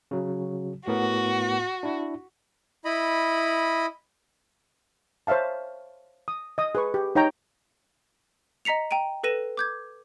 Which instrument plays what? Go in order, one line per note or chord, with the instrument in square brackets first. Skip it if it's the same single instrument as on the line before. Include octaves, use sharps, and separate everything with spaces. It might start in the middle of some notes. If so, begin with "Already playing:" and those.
[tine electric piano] C#3 F#3
[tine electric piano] A2 B3 A#4 [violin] F#4
[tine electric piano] D4 E4
[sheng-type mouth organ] E4 D#5 B5
[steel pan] C5 C#5 E5 F5 A5
D#6
D#5 D#6
G#4 B4 C#6
G4
D#4 C#5 G5 A#5
[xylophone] D#5 A#5 B6 C#7 F7
G5 A#5 D7 D#7
A4 B4 A#6 D#7 E7
D6 G6 G#6